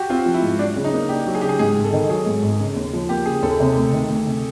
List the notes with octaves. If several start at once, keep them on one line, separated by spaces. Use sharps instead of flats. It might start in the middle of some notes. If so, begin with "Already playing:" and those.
Already playing: F#4 G4
C4 F4
F3
E4
G#2
F#3 D4
C#3
D#4
A#3
D4 G4
F#3
G#4
C#3 G4
G#4
G#2 G#4
G#1
A4
D#3
F#3 G#4
G#2
G#1
C#3
D#2
F3
A#3 G4
C#3 G#4
D#2 A4
C3
D2
D#3
D2
C3